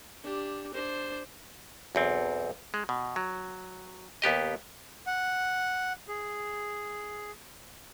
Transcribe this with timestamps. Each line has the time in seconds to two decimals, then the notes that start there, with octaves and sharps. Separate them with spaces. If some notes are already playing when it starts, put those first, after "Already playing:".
0.24 D4 G4
0.74 D4 C5
1.95 B1 E2 C4
2.74 G#3
2.89 B2
3.16 F#3
4.22 D#2 B3 G4 D#5
5.07 F#5
6.08 G#4